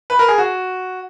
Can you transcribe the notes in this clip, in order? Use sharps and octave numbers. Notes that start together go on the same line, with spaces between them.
B4
A#4
G#4
F#4